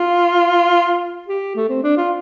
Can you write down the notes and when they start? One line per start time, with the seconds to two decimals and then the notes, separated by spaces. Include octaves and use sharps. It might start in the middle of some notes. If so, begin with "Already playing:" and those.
Already playing: F4
1.28 G4
1.56 A3
1.69 C4
1.83 D4
1.97 F4